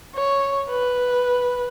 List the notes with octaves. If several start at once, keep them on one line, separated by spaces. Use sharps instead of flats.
C#5
B4